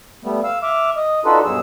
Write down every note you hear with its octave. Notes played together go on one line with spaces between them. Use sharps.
G3 A3 B3
F5 E6
E5 D6 F6
D#5
D4 D#4 F4 F#4 A4 B4
G2 B2 F#3 G#4 E6